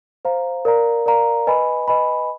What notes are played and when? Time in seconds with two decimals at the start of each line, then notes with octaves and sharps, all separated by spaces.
0.25 C5 F5 A#5
0.65 A#4 D5 F5 A#5
1.06 A#4 D5 F5 A#5
1.47 B4 D#5 G#5 B5
1.88 B4 D#5 G#5 B5